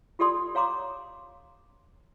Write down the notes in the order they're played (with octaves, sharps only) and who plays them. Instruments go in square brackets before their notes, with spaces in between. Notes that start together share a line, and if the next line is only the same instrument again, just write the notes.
[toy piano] F4 G4 A4 D5 C6 D#6
C#5 F5 A#5 C6 D6